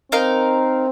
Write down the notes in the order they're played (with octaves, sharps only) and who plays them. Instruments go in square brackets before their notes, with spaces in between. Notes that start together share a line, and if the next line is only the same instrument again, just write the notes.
[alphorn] C4 [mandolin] D#4 A#4 F5